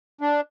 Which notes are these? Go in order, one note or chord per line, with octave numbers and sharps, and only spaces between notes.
D4